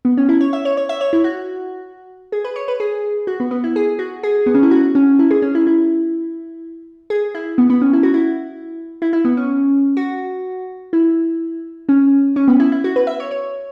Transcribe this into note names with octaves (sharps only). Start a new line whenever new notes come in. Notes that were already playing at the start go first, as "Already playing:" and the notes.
B3
C#4
E4
C#5
E5
C#5
C#5
E5
C#5
E4
F#4
G#4
B4
C#5
B4
G#4
F#4
B3
B3
E4
G#4
F#4
G#4
B3
C#4
E4
F#4
C#4
E4
G#4
C#4
E4
E4
G#4
E4
B3
B3
C#4
E4
F#4
E4
E4
E4
B3
C#4
F#4
E4
C#4
C#4
B3
E4
E4
F#4
B4
E5
C#5
C#5